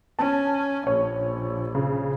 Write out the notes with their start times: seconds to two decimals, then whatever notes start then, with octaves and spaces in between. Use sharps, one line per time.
0.19 C#4 A5
0.87 A#1 C#5
1.75 C#3